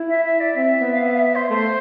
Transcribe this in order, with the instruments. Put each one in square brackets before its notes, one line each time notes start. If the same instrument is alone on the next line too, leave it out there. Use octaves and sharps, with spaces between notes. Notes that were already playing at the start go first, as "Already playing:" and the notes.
Already playing: [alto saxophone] E4
[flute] E5
E5
D5
[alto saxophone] C4 [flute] E5
[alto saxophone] B3
[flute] F5
E5
F5
E5
C5
[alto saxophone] A3 [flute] C5